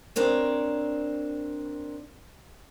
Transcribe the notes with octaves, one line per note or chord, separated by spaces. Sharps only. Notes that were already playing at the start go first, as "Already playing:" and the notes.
C4 D4 A#4 C#5